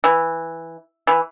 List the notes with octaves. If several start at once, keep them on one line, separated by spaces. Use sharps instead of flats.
E3
E3